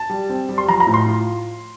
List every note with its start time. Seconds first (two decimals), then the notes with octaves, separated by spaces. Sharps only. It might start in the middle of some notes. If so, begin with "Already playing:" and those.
Already playing: A5
0.10 G3
0.30 C4
0.49 G3
0.58 C6
0.68 F3 A#5
0.80 A#5
0.87 A2
0.94 C6
1.06 F4